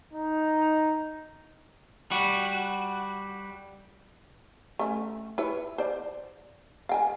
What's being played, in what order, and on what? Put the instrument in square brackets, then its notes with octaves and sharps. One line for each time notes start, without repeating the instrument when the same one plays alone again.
[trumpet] D#4
[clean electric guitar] G3 F#4
[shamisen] A3 C#4
E4 B4 C#5
C5 D5
F5 G5 G#5